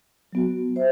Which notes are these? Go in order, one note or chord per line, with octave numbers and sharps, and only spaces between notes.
F#3 B3 F#4
C5 E5